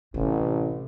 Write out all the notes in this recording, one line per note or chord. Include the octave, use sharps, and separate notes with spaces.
A1 C3